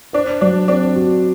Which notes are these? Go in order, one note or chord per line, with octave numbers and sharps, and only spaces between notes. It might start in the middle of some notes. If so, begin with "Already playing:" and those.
D4 C5
F#3 D4
C4 D4
F#4